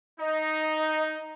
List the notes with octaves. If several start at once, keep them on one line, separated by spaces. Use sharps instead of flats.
D#4 D#5